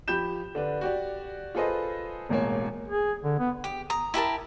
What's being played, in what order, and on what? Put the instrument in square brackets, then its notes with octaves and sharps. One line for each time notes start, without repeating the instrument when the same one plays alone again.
[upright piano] F3 G4 B5 G6 E7
D3 D4 B4
F#4 G4 D5
F4 G#4 A4 B4 C5 D#5
E1 A1 G#3 A#3 C#5
[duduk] G#4
D3
B3
[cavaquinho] G4
A#5 D#6
E4 G4 A#4 A5